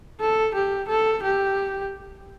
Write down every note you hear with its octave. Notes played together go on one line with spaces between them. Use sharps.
A4
G4
A4
G4